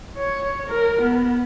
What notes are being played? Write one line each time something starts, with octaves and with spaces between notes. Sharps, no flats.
C#5
A#4
B3